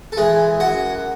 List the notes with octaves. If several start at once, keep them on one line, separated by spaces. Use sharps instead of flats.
A4
E3 G#3 G#4
F#2 F#4 F#5